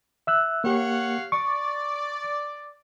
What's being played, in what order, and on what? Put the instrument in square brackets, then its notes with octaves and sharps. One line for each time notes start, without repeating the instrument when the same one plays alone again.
[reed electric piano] E5 E6 F#6
[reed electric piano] A#3 G4 [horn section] C#5 F5 F#5
[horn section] D5 [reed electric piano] C#6